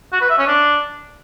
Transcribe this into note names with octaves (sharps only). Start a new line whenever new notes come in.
F#4
B4
E5
C#4
D4